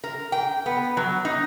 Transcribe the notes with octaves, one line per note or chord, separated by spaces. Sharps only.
A#4
G5
B3
F#3
D#4